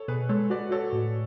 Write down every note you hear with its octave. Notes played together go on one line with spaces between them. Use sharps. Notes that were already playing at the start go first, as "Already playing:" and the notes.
Already playing: A4 C#5
B2 G#4 B4
G#3 A4 C#5
F#4 B4 D5
F#4 A4 C#5
A2